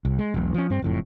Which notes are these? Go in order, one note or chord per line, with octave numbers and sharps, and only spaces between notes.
C2
G#3
E1 B1
F3 C#4
G2 C4
F#1 F2 A2